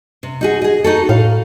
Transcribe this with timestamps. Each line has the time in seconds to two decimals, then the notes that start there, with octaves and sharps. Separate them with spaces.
0.23 C3
0.41 D#4 F#4 G#4
0.62 G#4 D#5
0.84 D#4 F#4 A4
1.09 A2 F5